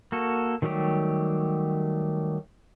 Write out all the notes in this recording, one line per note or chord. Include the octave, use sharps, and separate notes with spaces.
A#3 F#4 A4
D#3 F#3 G3 A3 G4